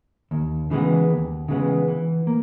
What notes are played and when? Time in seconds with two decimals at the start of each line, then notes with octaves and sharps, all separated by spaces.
0.31 D#2
0.70 C#3 E3 G#3 B3
1.10 D#2
1.48 C#3 E3 G#3 B3
1.88 E3
2.27 A#3